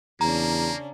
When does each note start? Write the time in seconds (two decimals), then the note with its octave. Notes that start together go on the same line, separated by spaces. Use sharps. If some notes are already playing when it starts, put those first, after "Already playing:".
0.21 E2 C#3 A#3 C#4 D4 A#5